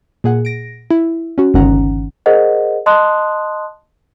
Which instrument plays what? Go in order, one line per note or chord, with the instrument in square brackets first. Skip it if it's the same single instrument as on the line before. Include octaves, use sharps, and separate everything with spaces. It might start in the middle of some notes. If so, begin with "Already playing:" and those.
[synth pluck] A#2 G#4 F#5
A#6 D7
E4
C#4 F#4
G1 C#2 D#3 C#4 F#5 A#5
[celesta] G#4 A#4 C5 D#5 F#5
D#5 A5 C6 D#6 F#6